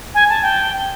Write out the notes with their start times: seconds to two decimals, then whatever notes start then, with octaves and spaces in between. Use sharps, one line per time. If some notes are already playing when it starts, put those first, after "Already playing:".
0.15 G#5
0.29 A5
0.42 G5